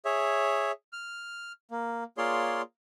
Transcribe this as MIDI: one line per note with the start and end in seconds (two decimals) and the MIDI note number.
0.05 0.72 68
0.05 0.72 73
0.05 0.72 76
0.93 1.52 89
1.71 2.04 58
2.18 2.62 58
2.18 2.62 65
2.18 2.62 68
2.18 2.62 73
2.18 2.62 74
2.18 2.62 84